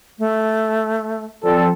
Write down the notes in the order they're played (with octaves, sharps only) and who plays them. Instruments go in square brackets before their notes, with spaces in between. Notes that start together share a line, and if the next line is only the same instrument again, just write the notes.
[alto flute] A3
[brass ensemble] F3 C4 A4 [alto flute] D5